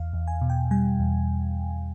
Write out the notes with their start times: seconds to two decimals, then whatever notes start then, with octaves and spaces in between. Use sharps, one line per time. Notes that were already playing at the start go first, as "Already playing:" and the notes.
Already playing: E2 F5
0.13 E2
0.28 G#5
0.41 B2
0.50 G5
0.71 G3 G#5
1.00 E2